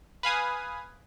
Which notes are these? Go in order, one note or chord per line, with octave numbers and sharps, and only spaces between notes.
B4 F5 G#5 D#6